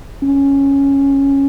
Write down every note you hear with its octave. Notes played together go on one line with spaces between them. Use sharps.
C#4